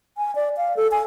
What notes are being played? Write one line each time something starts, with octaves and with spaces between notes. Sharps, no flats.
G#5
D5
F5
A4
G#5